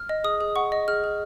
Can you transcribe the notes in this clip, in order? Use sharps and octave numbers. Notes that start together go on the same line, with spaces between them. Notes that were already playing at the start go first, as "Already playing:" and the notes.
Already playing: F6
D#5
G#4 D#6
G#4
F#5 C#6
D#5
G#4 F6
G#4